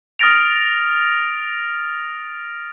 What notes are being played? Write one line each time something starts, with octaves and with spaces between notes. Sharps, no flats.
D#6 F6 A6 A#6 D7 F7